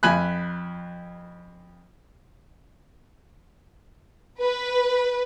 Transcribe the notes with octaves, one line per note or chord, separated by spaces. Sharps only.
F2 G#5 B5 F#6
B4